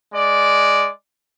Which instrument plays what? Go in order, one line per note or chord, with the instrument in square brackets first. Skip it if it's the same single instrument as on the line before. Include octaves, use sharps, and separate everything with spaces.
[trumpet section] G#3 D5